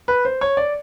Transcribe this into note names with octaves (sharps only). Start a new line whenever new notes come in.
B4
C5
C#5
D5